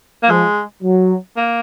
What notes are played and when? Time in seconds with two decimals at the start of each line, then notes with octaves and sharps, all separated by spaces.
0.23 A#3
0.29 F3 G#3
0.83 F#3
1.36 A#3